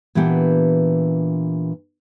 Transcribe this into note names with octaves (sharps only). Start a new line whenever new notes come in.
A#2 E3 B3 D4 G4 F#5